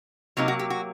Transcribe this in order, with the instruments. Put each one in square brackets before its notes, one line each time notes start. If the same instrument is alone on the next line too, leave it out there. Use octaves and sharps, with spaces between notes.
[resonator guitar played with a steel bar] C3 F#3 A#3 D#4
F#4
G4
F#4